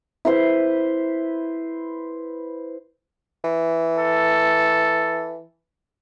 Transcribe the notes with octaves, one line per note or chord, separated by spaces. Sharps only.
E4 B4 C5
E3
A4